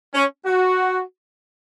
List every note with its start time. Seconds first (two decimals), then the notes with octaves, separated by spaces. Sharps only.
0.15 C#4
0.45 F#4